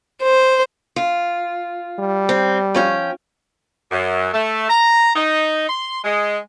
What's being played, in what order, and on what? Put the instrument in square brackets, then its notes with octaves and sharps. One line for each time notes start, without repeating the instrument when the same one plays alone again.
[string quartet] C5
[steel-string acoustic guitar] F4
[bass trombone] G3
[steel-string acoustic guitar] C4
F3 C#4 G5
[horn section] F#2
A3
A#5
D#4
C6
G#3